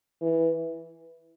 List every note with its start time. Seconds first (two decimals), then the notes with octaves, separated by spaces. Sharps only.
0.21 E3